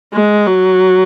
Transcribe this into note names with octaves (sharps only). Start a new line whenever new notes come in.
G#3
F#3